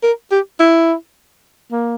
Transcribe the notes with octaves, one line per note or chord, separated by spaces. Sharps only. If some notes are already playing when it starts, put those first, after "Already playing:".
A#4
G4
E4
A#3